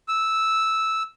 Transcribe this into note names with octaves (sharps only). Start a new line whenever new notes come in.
E6